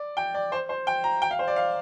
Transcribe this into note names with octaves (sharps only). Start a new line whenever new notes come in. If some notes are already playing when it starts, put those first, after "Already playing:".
Already playing: D5
G5
D5
C5
C5
G5
A#5
G5
F5
C5
D5
F5